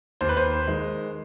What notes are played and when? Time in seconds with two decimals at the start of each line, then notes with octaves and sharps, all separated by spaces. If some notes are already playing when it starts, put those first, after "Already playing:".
0.21 D#2 C5
0.29 B4
0.37 C5
0.67 D#3 G#3